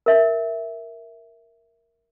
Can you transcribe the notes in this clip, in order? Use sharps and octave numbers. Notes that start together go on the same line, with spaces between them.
A#4 E5